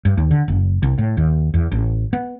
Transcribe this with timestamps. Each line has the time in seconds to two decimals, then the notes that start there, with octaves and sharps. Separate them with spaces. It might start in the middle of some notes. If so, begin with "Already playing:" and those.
0.05 G2
0.17 D#2
0.31 D3
0.48 F#1
0.83 C2
0.98 A2
1.17 D#2
1.54 E2
1.72 A1
2.13 B3